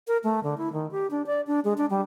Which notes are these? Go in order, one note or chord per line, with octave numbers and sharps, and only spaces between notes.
A#4
A3
D3
E4
D#3
G4
D4
D5
D4
G#3
D4
G3